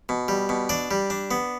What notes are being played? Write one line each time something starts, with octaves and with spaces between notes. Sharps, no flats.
B2
G3
B2
D4 D5
G3
D4
B3